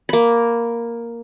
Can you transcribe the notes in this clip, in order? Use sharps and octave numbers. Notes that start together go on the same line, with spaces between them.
A#3 B5